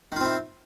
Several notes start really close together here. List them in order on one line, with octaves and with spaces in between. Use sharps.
D#3 F4 C4 E4